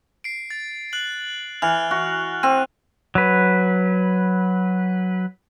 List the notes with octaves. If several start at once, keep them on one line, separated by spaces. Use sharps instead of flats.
C7 D7
A6
F#6 F#7
E3 F6 F#6 F7
F#4
C4 D#7
F#3 B4